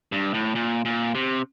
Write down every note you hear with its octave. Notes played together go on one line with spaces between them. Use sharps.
G2
A2
A#2
A#2
C3